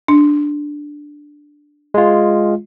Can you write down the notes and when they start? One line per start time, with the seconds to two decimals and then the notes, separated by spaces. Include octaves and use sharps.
0.08 D4
1.94 G#3 F4